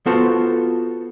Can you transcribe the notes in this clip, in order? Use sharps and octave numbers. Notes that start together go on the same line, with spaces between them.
B3 F4 F#4 A4 C5